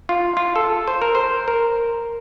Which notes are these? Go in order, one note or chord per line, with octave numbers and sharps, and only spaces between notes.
F4
F4
A4
C5
A#4
C5
A#4